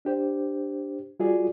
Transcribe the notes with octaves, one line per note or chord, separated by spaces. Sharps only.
D4 G4 C5
G3 F4 F#4 G#4 D5